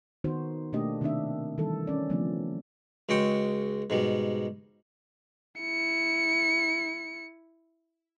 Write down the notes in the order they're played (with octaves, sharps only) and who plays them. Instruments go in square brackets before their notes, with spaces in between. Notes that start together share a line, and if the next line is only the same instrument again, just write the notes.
[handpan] D#3 B3 D#4 F#4 C5
B2 A3 A#3 D4 G4 D#5
C3 D#3 C4 D4 E5
D#3 E3 G3 A4
C#4 D5
C#3 F3 A3 B3 C4 D4
[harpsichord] C#2 G#3 F#4 G5 C#6
G#2 B2 G3
[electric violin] E4 C#7